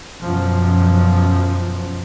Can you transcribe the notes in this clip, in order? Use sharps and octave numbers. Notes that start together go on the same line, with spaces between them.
F#2 B2 F3